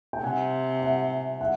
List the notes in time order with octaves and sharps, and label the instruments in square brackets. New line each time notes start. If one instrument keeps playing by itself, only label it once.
[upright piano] G5
[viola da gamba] C3 [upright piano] F#5 G#5
[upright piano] E5 F#5
E5 F#5